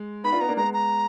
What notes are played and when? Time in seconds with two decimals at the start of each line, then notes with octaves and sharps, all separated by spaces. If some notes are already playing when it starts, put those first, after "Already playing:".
Already playing: G#3
0.24 B3 D#4 B5
0.32 D4 F4
0.41 B3 D#4 A#5
0.49 A#3 D4
0.57 G#3 B3 A#5
0.74 A#5